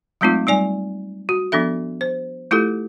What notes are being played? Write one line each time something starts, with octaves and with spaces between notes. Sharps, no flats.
F#3 G#3 A3 C4 D#4 F4
G3 D#4 D5 G#5
F#4
F3 B3 D4 A4 E5
C5
A3 E4 F4 G4 A4